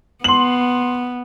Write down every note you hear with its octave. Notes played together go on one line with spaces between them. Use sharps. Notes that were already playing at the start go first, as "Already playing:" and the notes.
B3 C6 F#7